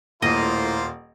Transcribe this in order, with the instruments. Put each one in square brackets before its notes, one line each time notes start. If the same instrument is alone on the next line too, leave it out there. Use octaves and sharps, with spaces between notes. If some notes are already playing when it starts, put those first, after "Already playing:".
[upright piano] D#1 [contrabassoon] A2 [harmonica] A#3 F4 C5 [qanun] D#5